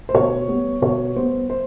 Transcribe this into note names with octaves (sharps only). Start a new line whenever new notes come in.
C5
B2 C#5
G3 B3
B2 C#5
G3 B3 C5
C5